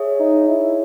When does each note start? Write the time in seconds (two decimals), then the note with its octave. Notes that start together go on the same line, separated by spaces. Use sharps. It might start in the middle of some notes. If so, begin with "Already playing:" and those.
Already playing: G#4 C#5 E5
0.20 D#4
0.49 E4